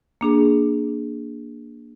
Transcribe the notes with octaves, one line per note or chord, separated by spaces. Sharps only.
A#3 D4 G#4